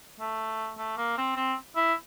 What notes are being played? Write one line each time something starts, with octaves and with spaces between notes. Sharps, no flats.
A3
A3
A#3
C4
C4
E4